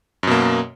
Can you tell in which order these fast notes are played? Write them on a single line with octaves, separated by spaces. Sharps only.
F#2 B2 A#3